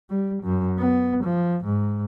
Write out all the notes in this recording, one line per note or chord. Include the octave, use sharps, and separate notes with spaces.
G3
F#2
B3
F3
G#2